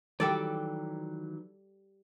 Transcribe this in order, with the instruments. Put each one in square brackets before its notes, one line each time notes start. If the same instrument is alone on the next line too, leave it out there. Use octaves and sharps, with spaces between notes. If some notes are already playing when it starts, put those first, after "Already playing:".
[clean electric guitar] D#3 E3 F#3 [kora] G3 A4 D5